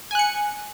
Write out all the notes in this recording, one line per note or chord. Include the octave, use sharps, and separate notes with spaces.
G#5 F#6 C#7